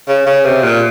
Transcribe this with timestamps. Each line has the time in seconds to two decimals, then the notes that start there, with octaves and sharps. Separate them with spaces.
0.08 C#3
0.27 C#3
0.45 C3
0.63 A#2